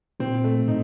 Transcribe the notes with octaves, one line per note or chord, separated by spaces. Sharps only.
A#2 C4
A3
A2 D#4